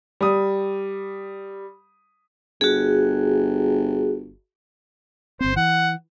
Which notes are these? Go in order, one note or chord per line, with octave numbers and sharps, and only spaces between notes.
G3 D#6
G1 F#4 G#4
G1 C4 C5
E3 F#5